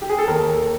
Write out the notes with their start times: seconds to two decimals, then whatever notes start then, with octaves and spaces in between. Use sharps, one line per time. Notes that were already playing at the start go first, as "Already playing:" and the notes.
0.02 G4
0.09 G#4
0.19 A4
0.27 D#2 A#4